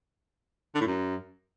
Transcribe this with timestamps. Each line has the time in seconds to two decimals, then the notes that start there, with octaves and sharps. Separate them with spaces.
0.75 D3
0.81 A2
0.87 F#2